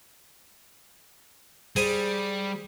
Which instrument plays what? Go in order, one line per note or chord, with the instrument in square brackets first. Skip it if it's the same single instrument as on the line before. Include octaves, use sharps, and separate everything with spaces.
[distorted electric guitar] G3 [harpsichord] G#4 C5 G#5